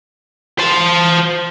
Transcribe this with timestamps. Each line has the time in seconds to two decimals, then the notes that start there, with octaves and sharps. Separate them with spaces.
0.59 C5 A5